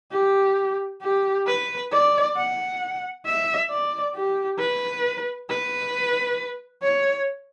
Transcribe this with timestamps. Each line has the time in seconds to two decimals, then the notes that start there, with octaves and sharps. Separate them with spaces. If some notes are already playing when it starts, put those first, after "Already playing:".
0.12 G4
1.02 G4
1.47 B4
1.91 D5
2.36 F#5
3.26 E5
3.70 D5
4.15 G4
4.59 B4
5.49 B4
6.82 C#5